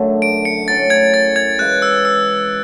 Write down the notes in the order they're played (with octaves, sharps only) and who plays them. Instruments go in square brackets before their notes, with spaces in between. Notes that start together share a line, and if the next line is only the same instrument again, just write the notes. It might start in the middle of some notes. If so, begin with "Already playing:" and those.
Already playing: [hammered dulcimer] F#2 D3 A3
[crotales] D7
C#7
[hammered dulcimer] A2 F#3 C#4 [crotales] A6
[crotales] G#6
A6
G#6
[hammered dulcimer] C#3 E3 G#3 [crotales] F#6
[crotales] E6
E6